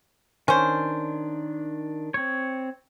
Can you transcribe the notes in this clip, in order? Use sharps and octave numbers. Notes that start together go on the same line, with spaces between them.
D#3 C#4 D4 C5
C4 C#5